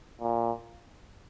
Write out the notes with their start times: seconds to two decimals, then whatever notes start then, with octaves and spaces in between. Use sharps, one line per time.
0.21 A#2